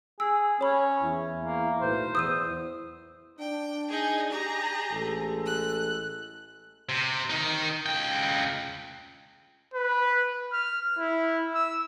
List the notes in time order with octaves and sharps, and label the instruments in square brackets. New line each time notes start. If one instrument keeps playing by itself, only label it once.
[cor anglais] G#4 [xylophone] E6
[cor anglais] C#4 [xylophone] C#5 B5
[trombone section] E2 E4
[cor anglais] A#3
[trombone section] B1 A2 B4 [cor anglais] C5
[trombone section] E2 [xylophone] D#6 E6 D#7
[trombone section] D4 [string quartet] G5
[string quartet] D#4 G#4 G#5
G4 G#4 A#5
[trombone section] A1 G#3 A4
[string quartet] F#6
[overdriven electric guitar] C3
D#3 D#4
C#2 G5
[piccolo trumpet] B4
F6
E4
E6